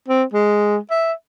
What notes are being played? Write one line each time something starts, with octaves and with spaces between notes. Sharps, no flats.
C4
G#3
E5